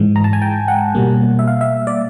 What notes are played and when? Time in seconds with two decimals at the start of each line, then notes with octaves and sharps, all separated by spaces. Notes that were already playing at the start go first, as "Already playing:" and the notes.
Already playing: G#2 E3 G#3
0.16 A#5
0.24 A5
0.33 G#5
0.42 G5
0.68 F#5
0.95 B2 G3 A#3
1.39 E5
1.47 F5
1.61 E5
1.87 D5